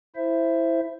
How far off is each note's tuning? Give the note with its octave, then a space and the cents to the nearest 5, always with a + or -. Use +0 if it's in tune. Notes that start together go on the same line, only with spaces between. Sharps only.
E4 +0 C5 +0 E5 +15